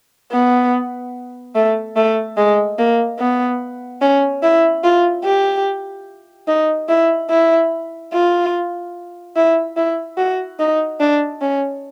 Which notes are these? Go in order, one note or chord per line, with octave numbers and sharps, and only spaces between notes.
B3
A3
A3
G#3
A#3
B3
C#4
E4
F4
G4
D#4
E4
E4
F4
E4
E4
F#4
D#4
D4
C#4